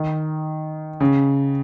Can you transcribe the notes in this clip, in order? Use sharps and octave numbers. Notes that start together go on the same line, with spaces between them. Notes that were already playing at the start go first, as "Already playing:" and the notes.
Already playing: D#3
C#3